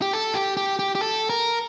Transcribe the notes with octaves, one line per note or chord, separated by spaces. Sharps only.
G4
A4
G4
G4
G4
G4
A4
A#4